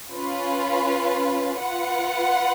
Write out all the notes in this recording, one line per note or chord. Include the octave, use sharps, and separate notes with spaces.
C#4 F4 B4
F4 B4 F#5